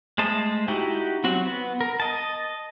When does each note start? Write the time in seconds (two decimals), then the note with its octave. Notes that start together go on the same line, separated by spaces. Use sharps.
0.18 G#3 A3 C5 A5 D#6
0.68 D#4 E4 F#4 G4
1.24 F#3 C4 F#4
1.45 B3
1.81 A#4
2.00 D#5 A5